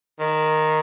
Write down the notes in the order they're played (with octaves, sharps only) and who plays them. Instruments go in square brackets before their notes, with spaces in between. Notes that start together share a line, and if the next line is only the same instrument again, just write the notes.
[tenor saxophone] D#3